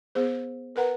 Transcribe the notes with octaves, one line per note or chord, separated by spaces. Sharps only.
B3 G#4 C5
A#4 B4 F#5 A#5